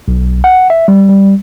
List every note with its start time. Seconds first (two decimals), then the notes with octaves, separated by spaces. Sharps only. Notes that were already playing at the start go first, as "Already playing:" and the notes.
0.08 B1
0.44 F#5
0.70 E5
0.88 G3
1.09 G3